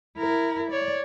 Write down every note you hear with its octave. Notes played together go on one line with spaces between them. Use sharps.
E4 A#4
C#5 D5